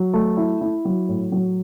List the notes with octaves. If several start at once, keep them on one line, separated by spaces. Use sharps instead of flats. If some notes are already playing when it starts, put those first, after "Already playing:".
Already playing: F#3
A3
E4
E4
F#3
A2
F#3